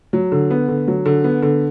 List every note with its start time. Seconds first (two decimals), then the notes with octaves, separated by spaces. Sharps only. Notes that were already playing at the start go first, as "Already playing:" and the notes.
0.13 F#3
0.32 D3
0.51 B3
0.68 D3
0.88 F#3
1.06 D3
1.24 B3
1.42 D3